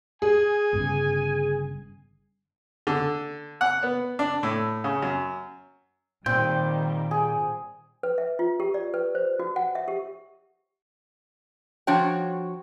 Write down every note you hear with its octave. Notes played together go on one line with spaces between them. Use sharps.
G#4 G#5
G1 G2 C#3
D3
F#5
B3
D4
A2
C#3
F#2
A#2 D#3 G3 C4 G5
G#4
B4
E5
F4
G4
D5
B4
C5
F#4
F#5
E5
G4
F3 D4 F#4 C#5 G5